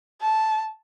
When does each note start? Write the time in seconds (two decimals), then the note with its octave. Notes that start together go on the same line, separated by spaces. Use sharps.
0.21 A5